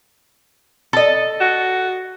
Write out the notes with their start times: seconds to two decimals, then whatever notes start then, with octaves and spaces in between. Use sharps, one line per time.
0.93 A4 D#5
1.41 F#4